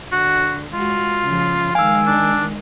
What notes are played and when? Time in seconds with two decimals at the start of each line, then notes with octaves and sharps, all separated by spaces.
0.12 D3 F#4
0.73 G#3 F4 F#4
1.23 C#3 F3
1.75 D#3 G#3 F5 G#5 E6
2.07 D4